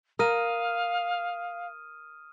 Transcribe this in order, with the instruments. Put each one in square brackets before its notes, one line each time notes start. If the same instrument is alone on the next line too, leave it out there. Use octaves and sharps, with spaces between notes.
[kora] A#4 [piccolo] F5 [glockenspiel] D#6 F6 D#7